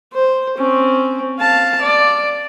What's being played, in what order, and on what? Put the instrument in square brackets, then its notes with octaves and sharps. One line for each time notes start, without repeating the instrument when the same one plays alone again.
[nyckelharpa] C5
C4 C#4
F5 A5
D5